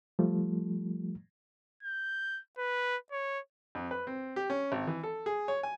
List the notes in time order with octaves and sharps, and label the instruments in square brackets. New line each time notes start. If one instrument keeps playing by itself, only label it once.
[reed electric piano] F3 G3 A3
[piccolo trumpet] G6
B4
C#5
[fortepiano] F2
B4
C4
G4
C#4
G#1
E3
A4
G#4
C#5
G#5